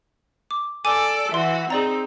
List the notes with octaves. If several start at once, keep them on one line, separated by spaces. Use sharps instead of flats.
D6
A4 D5 G#5 D6 D#7
E3 F#4 E5 C6
C4 D#4 G#4 D5 A#5